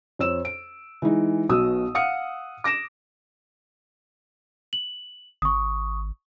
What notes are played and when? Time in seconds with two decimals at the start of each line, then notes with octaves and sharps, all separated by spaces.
0.19 F2 C#5 E6 E7
0.45 D7
1.02 E3 G#3 D#4
1.49 B1 B2 D#6 E6
1.95 F5 F#5 D#6 F6 C#7
2.64 D6 A#6 D7 E7
4.73 F#7
5.42 G#1 C#6 D#6